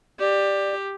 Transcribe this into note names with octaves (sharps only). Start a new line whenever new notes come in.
G4 D5